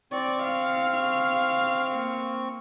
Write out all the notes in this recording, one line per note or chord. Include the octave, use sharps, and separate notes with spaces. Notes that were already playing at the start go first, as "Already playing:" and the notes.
C4 D5 C#6
F5
A#3